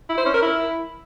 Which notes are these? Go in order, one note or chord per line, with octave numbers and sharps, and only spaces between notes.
E4
C5
C#4
A#4
E4